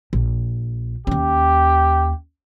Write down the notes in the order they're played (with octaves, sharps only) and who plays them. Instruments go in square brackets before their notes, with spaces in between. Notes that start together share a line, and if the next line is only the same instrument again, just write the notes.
[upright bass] A#1
[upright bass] D#2 C#4 [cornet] G4